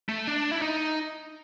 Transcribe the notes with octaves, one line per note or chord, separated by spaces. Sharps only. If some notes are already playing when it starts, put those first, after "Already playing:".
A3
D4
E4
D#4